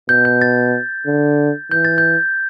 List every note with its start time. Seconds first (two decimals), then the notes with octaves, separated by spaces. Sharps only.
0.09 B2 G6
0.25 G6
0.42 A6
1.07 D3
1.71 E3 G6
1.85 A6
1.98 G6